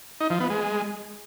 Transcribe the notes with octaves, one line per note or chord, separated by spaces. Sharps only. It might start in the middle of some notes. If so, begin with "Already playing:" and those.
D#4
F3
B3
G#3